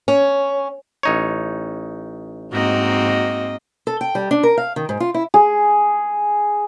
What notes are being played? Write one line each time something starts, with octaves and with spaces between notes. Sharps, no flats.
C#4
A1 D#4 C#5
G#2 A#3 C4 F#4 D#5
A4
G5
G3
D4
A#4
F5
D#3
G#2
F4
E4
G#4